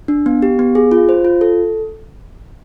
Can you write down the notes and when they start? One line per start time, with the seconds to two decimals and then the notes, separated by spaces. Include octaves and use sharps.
0.08 D4
0.26 B3
0.42 G4
0.59 B3
0.75 G#4
0.92 F4
1.09 C5
1.25 F4
1.41 A4